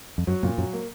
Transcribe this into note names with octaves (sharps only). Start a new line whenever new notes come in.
F2
F#2 F#3
F#2 A#2
F#2 F#3
A#3